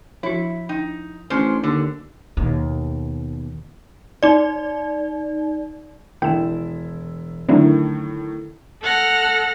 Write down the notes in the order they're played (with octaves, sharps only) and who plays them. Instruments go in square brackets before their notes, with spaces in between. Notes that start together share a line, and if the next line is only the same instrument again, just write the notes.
[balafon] F3 F#4 [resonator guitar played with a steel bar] E4
[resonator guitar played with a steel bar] D#4 [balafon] G5
[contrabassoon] A1 [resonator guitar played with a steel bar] C#4 D4 C5
[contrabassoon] D#2 [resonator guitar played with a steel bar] D3
[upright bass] D#2 B2
[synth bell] D#4 D5
[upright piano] E1 E4 [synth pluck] D#3 E7 [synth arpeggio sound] G5
[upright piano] A2 D#3 [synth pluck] D3 F#3 [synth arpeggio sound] C4 D4 E4
[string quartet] A4 F#5 F6 A#6